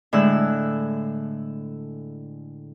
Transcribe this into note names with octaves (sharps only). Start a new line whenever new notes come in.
A2 D3 G#3 E6 F#6